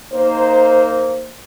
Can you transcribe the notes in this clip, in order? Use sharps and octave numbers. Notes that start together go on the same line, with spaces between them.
A#3 D#4 C5